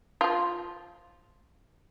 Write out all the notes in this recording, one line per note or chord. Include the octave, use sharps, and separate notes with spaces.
F3 F4